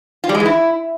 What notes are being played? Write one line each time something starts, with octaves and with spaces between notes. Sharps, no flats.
F4
G3
G#3
E3
E4